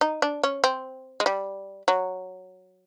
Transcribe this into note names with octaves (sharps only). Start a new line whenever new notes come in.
D#4
D4
C#4
C4
G#3
G3
F#3